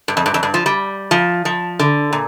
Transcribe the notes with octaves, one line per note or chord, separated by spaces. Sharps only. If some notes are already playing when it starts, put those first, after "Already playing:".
G2
F2
G2
F2
G2
F3
G3
F3
F3
D3
A#2